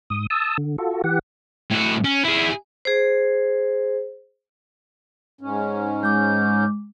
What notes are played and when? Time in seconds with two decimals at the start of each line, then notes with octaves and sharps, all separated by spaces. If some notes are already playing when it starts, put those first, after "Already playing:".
0.10 G#2 D#6
0.30 A5 D#6 E6
0.58 D3
0.78 F4 F#4 A4
1.04 E3 G4 F#5
1.70 A2 F#4
2.04 C#4
2.25 E4 G#4
2.85 G#4 C5
5.41 G#2 C#4
6.03 G#3 D6 G6